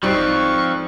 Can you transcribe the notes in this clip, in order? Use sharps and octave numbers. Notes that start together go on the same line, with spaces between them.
E1 G#2 F3 G3 C4 C#6